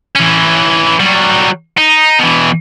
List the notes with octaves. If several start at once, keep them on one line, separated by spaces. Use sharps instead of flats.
E3 C#4
F#3 G3
D#4
B2 E3